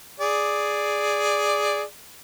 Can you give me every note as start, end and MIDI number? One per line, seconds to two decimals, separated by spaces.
0.20 1.82 68
0.20 1.82 74